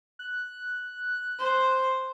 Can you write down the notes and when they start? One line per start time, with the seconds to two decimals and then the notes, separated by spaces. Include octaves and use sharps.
0.19 F#6
1.39 C5